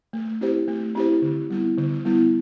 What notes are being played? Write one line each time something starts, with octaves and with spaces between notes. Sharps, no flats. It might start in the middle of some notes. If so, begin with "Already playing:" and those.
A3
C4 E4 G4 C5
A3
C4 E4 G4 C5
D3
G3 B3 E4
D3
G3 B3 E4